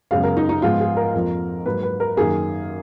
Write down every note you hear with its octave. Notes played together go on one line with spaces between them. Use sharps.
F#2 C#3 G#3 B3 F5
A#4
D#4
D#4
G#2 F3 G#3 B3 F4
G#4
A#4
F2 F3 A#3
G#2 F#3 A#3 B4
B4
A#4
F#2 D#3 A#3 G#4